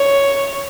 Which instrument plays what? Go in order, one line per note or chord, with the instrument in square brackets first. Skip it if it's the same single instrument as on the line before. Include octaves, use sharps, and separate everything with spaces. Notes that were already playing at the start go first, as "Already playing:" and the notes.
Already playing: [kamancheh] C#5